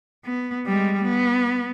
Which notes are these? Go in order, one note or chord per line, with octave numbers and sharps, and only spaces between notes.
B3
G3 G#3
B3